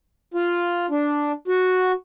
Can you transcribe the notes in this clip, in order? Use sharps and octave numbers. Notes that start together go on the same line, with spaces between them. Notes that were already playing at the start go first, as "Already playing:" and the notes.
F4
D4
F#4